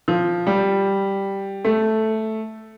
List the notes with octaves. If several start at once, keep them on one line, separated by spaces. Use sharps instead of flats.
F3
G3
A3